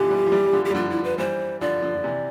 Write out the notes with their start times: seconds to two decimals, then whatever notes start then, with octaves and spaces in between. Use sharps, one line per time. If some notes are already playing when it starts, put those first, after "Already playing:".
Already playing: B2 D3 E3 F3 G4
0.10 E3 G3
0.26 F3
0.32 E3 G3
0.46 G3
0.53 D3 F3
0.65 G4
0.70 G3
0.75 D3 F3 F4
0.90 E4
1.04 B4
1.18 E3 G3 C5
1.61 D3 F3 D5
1.82 D3 F3
1.95 F3
2.04 C3 E3